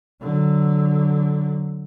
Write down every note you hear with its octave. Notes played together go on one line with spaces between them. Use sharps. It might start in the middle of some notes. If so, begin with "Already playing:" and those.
D3 F#3